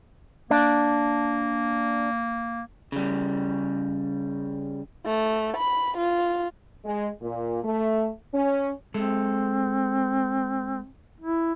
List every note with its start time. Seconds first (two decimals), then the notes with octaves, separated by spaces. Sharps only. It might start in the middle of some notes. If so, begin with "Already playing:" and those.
0.51 A#3 D4
2.92 C#3 G3
5.05 A3
5.57 B5
5.97 F4
6.85 G#3
7.21 A#2
7.64 A3
8.34 C#4
8.94 G#3 C4 A4
11.20 E4